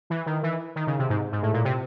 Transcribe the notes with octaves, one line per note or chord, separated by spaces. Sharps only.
E3
D#3
E3
D#3
C#3
C3
G#2
G#2
A2
A#2
C3